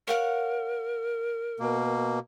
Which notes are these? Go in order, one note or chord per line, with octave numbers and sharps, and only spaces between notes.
A#4 C#5 F5 F#5
B2 A#3